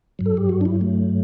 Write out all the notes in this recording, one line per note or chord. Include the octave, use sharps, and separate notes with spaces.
G2 F#3
A4
G4
F#4
D4
E4
A3